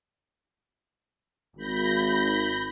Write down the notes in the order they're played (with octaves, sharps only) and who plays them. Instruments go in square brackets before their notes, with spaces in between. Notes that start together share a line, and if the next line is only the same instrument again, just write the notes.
[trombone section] G#1 [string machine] B5 G6 A#6